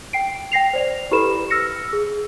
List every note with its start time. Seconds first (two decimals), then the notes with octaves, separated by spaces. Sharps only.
0.13 G5 C7 D7
0.52 G5 A#6 C7 F7
0.73 C5 D5 F7
1.11 E4 G4 A4 B4 B5 E7
1.50 E6 F6 A#6 C#7
1.88 G#4 E6